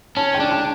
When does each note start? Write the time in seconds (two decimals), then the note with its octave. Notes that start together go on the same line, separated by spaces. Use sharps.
0.17 C#4 A5
0.34 G5
0.40 D4
0.51 A5